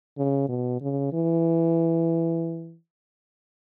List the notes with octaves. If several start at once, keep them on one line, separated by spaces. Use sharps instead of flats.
C#3
B2
C#3
E3